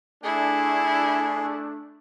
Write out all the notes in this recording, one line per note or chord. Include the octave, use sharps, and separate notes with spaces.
A3 D4 E4 G#4